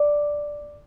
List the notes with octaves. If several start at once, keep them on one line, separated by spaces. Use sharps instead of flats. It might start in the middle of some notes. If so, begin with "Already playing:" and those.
Already playing: D5